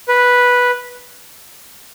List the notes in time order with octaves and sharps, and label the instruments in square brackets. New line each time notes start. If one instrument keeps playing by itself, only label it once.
[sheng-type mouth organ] B4